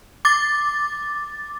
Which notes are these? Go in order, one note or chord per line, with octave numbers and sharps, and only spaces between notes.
D6 A6